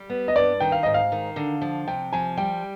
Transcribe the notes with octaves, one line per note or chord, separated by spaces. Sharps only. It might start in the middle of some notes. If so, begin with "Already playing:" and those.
Already playing: G3
B3
D#5
G2 D5
D#3 G5
F5
G#2 D#5
F5
D#3
D3
F3
C3 G5
F3 G#5
G3 G5